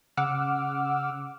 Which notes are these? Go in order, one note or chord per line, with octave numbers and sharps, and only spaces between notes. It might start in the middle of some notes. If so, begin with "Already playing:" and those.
C#3 F#5 D6 E6 F6